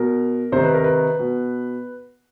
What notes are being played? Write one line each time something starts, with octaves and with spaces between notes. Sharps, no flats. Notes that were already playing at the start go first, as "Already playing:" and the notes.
Already playing: B2 A#4
C3 D#3 C5
B4
A#4
B4
B2